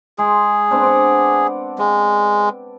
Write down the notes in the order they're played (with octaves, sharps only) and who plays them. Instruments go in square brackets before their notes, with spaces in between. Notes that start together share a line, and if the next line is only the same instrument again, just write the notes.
[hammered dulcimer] G#3 [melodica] G#4
[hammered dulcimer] B3 C4 D4
D5 F#5
[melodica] G#3 [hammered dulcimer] G5